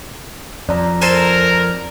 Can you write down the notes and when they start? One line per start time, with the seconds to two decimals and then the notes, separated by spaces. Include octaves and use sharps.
0.69 F2 D5 A#5
1.02 A4 A#4 C5 G#5